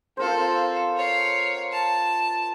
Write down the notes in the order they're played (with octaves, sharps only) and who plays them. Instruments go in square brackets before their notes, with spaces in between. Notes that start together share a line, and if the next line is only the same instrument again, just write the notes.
[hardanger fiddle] C4 A4 [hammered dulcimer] F4 A#4 C5
[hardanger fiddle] C#5 F5
A5